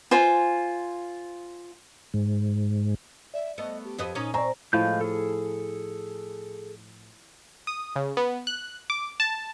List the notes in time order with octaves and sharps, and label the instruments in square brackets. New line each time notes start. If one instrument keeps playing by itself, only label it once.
[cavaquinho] F4 C5 G#5
[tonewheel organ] G#2
[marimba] D5 [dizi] E5
[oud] A3 B3 [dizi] D#5
[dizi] G4
[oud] F2 B4 D#5
[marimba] A#2 [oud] C#4 D#4
[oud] C4 [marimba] D5 D#5 G#5 [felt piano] A#5 [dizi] C#6
[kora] A2 F3 [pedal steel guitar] G#3 F5 G6
[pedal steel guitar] G#4 A4
[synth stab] D#6
C#3
B3
F#6
D6
A5